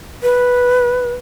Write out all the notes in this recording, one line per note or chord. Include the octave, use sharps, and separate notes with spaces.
B4